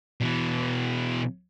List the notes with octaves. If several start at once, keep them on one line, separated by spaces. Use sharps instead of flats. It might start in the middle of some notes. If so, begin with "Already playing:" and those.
B2 E3